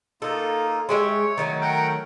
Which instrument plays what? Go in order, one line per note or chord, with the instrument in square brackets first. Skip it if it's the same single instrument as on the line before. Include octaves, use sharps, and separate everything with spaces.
[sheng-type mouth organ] A#3 D#4 F4 [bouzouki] A4
[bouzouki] G#3 G4 E5 [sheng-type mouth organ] C#5
[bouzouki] D#3 F#3 A3
[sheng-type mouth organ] A#4 F#5 G5